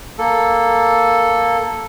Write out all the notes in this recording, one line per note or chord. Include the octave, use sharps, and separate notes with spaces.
A#3 A4